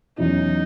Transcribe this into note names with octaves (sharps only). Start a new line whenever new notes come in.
E2 D#3 F#3 C#4 D#4 E4